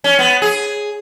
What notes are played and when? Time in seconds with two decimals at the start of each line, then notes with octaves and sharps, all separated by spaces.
0.04 C#4
0.19 B3
0.42 G#4